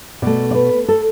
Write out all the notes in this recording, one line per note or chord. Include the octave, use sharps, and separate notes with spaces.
B2 A3 D5
D5
B4
A4